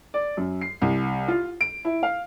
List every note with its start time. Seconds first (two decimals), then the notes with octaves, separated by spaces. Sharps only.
0.14 D5
0.37 F#2
0.61 C7
0.82 C2
1.28 F4
1.61 D7
1.85 E4
2.03 F5